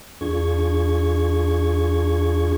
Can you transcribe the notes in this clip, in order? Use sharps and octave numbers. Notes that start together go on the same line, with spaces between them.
E2 D4 F4 G#4 C#6 G#6